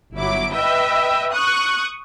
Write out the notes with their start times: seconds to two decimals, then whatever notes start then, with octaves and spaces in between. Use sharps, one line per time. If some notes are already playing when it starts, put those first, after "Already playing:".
0.15 G1 F#3 E4 D6
0.54 B4 D#5 E5 G5
1.32 C#6 D#6 F#6